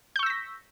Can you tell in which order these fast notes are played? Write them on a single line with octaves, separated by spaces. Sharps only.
G6 C#6 E6 A#6 B6